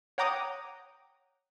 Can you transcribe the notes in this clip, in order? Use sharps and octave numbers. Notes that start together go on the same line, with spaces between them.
C#5 F#5 G5 A#5 D6 D#6